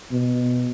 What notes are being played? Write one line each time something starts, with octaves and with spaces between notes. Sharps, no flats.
B2